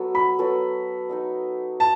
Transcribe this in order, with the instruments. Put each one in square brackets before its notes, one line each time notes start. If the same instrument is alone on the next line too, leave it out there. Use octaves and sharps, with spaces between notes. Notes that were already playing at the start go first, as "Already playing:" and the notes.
Already playing: [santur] F#3 B3 F#4 A4
[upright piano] B5
[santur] F#3 B3 F#4 A4
D#4 A4 D#5
[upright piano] A5